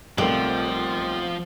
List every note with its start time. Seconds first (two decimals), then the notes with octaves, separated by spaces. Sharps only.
0.18 B1 F3 G3 A3 C4 G4 A#4